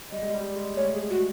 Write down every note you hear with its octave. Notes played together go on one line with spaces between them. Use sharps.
G3 D#5
G#3
G3
G#3
A3 C#5
G#4
F#4